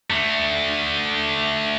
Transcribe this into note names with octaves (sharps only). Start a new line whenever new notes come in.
D3 A3